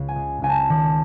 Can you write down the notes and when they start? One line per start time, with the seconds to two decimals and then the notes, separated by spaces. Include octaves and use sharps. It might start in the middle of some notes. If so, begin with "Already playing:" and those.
Already playing: C#2
0.08 G#5
0.16 G#3
0.42 C#2 G#5
0.49 A5
0.69 D#3